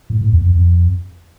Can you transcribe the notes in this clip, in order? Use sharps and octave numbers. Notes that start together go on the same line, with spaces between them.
A2
A2
E2
F2
F2